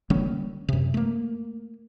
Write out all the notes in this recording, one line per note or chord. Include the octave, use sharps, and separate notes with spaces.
D3 G3 A#3 C#4
F#2 C3
A3 A#3